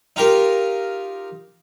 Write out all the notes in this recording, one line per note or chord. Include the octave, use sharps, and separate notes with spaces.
D#4 F4 G4 A#4